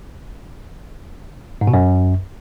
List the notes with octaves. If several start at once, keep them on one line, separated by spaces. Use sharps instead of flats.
G#2
B2
F#2